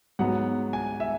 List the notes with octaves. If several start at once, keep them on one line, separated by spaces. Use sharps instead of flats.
G#2 F#3 B3 F#5
G#5
E5